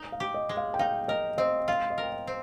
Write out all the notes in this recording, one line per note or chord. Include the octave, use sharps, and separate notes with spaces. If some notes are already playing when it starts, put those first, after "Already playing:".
Already playing: D#4
F5
G4
D#5
G#3
F5
G5
D#4 F5
A#4 D#5
C4 D#5
F4 F5
D#5
A#4
G5
F5
C4